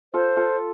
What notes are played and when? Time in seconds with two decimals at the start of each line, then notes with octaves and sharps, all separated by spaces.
0.14 F4 A4 C5
0.37 F4 A4